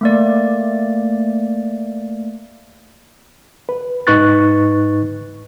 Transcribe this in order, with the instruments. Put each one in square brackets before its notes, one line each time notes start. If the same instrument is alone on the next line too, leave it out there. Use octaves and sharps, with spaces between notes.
[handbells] A3 A#3 D5
[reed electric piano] B4
G#2 D#4 B4 C#6 F#6 A6